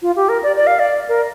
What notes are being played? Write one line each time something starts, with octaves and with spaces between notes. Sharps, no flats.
F4
G4
A#4
D5
D5
F5
D5
A#4